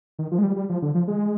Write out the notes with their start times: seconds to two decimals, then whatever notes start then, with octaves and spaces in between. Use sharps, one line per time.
0.19 D#3
0.31 F3
0.39 G#3
0.43 G3
0.56 G3
0.70 F3
0.82 D3
0.95 F3
1.08 G#3